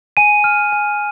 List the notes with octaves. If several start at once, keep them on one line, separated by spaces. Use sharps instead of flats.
G#5 D#7
F6
G#5